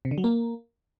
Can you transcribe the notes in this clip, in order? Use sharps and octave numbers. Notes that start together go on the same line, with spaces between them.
C3
D3
F#3
A#3